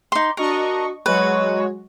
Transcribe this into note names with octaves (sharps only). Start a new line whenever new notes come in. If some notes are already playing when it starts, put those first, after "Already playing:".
D#4 C6 D6
D4 F#4 A#4 D#5 C#6
F#3 G#3 F#4 B4 C#5